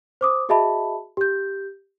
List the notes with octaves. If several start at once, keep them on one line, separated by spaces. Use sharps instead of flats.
C5 D6 D#6
F#4 G#4 D#5 E5 A5 B5
G4 G6